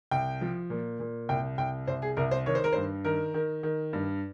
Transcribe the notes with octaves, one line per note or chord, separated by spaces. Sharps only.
C2 G5
F3
A#2
A#2
C2 G5
C2 G5
C2 C5
G#4
C2 A#4
C5
D#3 C#5
C5
A#4
G2 C5
D#3 A#4
D#3
D#3
G2